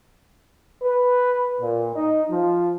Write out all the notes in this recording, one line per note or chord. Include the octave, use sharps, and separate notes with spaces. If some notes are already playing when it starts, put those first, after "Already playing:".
B4
A#2
D#4
F3